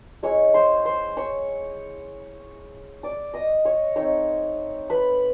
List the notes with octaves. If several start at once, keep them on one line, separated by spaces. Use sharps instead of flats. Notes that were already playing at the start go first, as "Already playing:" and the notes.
G#3 C#4 E4 C#5 C#6
C5 C6
C5 C6
C#5 C#6
D5 D6
D#5 D#6
C#5 C#6
A3 C4 D#4 C#5 C#6
B4 B5